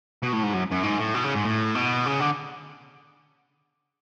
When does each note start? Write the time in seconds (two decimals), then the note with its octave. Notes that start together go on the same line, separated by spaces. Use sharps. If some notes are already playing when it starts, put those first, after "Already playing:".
0.23 B2
0.33 A2
0.43 G#2
0.53 F#2
0.71 F#2
0.83 G#2
0.99 A2
1.14 B2
1.24 C#3
1.35 G#2
1.45 A2
1.75 B2
2.06 C#3
2.20 D3